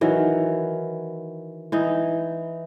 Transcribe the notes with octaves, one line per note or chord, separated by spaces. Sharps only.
D#3 E3 F#3
E3 D#4